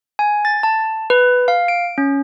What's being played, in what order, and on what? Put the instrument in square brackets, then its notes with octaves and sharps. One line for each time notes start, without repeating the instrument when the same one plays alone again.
[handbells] G#5
A6
A5
B4
F5
D7
C#4